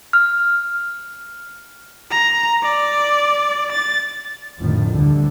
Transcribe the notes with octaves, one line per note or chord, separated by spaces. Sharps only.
F6
A#5
D5
A6
F1 A2 D3 D#3 F3
D2 A2 D3 G3